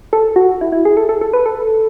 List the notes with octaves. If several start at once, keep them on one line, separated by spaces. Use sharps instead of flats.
A4
F#4
E4
E4
G#4
A4
A4
A4
B4
A4